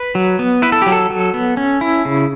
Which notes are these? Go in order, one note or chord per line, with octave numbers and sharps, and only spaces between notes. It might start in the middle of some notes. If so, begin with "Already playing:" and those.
Already playing: B4
F#3
B3
E4 B4
A4
F#3 G4
A4
F#3
B3
C#4
E4
C#3